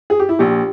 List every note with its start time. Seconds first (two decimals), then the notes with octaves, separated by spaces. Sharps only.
0.10 G#4
0.20 G4
0.29 E4
0.39 A#1 A#2 G4